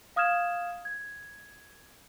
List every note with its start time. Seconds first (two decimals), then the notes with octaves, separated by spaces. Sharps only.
0.16 F5 D#6 F6 G#6 E7
0.85 G#6